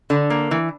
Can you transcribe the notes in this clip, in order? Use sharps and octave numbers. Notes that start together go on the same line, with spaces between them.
D3
A#3
E3